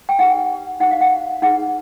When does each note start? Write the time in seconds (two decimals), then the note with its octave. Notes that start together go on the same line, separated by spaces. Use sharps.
0.09 G5
0.19 D#4 G4 B4 F#5
0.80 D#4 G4 C5 F#5
0.91 F5
1.01 F#5
1.42 D#4 G#4 B4 F#5